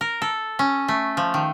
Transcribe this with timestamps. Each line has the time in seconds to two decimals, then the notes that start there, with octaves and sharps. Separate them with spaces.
0.01 A#4
0.22 A4
0.59 C#4
0.88 A3
1.17 F3
1.34 D#3